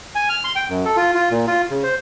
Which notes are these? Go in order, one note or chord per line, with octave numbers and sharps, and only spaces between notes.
G#5
F6
C6
G5
F#2
A4
F4
F4
A#2
F4
C#3
C5